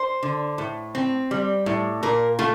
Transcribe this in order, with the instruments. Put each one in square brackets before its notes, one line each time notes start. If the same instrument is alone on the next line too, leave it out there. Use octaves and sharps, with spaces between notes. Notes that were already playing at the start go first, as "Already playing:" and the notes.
Already playing: [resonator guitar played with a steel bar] C5
D3
A2
C4
G3
A2
A#2 A#4
A3 F4